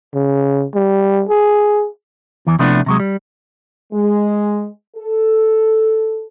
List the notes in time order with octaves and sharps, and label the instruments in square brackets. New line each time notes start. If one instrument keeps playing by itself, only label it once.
[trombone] C#3
G3
G#4
[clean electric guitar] E2 E3
C3 F3 A3 B3 D4 E4
C3 F#3 G#3
G3
[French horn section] G#3
A4